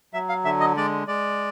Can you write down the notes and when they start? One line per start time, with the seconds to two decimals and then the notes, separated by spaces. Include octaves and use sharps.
0.13 F#3 E5
0.29 F5
0.44 D3 E5
0.60 D#5
0.76 G#3 D5
1.08 G#3 D5